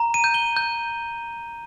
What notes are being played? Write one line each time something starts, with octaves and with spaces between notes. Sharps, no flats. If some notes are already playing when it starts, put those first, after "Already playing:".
Already playing: A#5
D#7
G6
G7
G6